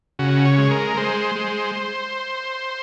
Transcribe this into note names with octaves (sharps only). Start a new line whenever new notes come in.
C#3 F#4
C#5
G#3
A#4
G#3 C5
G#3